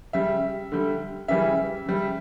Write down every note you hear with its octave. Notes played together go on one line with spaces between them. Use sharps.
C#3 G3 E5
D3 G3
C#3 E3 G3 E5
C#3 G3